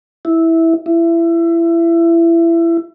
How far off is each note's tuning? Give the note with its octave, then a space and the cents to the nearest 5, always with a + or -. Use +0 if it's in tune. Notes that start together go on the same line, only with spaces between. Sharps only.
E4 -10
E4 +25